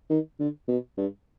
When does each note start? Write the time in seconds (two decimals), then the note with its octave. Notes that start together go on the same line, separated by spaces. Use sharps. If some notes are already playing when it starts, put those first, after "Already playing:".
0.10 D#3
0.39 D3
0.68 B2
0.97 G2